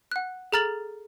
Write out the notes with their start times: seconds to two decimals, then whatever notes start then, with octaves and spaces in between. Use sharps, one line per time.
0.12 F#5 F#6
0.52 G#4 A4 A#5 F6 A6 F#7